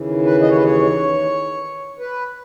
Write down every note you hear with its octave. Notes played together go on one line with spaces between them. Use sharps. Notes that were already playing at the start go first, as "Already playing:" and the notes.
Already playing: D#2 C#3 E3
B4
D#5
C#5
B4
C#5
B4